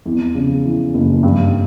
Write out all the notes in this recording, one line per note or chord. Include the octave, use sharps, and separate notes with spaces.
E2
C#3
E3
F#1
G2